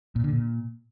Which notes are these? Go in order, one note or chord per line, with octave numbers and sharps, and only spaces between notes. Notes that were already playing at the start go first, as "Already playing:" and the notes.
A#2
D3
A#2